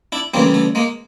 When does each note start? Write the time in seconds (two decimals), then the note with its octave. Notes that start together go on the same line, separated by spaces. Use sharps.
0.12 D4 E4
0.34 D2 C#3 E3 G3 A#3 C4
0.54 A3
0.75 G#3 A#3